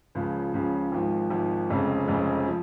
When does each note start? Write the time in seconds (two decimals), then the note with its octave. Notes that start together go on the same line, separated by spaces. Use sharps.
0.15 C#2 C#3 F3
0.54 C#2 C#3 F3
0.92 G#1 G#2 F3
1.30 G#1 G#2 F3
1.70 F1 F2 C#3 G#3 C4
2.08 F1 F2 C#3 G#3 C4
2.48 F3